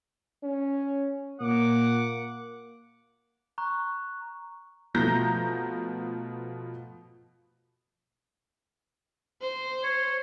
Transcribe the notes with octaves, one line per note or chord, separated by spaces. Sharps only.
C#4
A#2 A#3 F#5 D6
A#5 C#6 F#6
B2 F3 A3 A#5 G6 A#6
C5
C#5